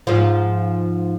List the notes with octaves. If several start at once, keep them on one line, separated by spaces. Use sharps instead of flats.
G#2 F3